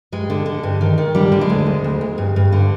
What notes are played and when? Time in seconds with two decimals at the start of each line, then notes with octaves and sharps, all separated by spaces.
0.12 G2 G#3
0.30 D3
0.46 D3
0.63 G2
0.81 D#3
0.98 D#3
1.15 D3 G3
1.32 D3
1.41 G#3
1.50 D2
1.66 D2
1.84 D2
2.01 D2
2.18 G2
2.36 G2
2.52 D3